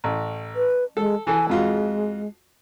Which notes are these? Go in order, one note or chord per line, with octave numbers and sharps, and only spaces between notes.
A1
B4
G#3 A4
E3 A4 G#5
F2 G#3 F4 F#4